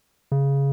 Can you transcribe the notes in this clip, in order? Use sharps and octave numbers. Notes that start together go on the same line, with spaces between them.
C#3